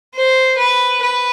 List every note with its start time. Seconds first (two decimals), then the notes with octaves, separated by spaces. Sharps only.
0.14 C5
0.57 B4
1.02 B4